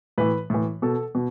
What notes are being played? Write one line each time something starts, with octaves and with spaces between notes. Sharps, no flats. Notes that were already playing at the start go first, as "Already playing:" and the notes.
A2 E3 B4
A2 E3
B2 A4
B2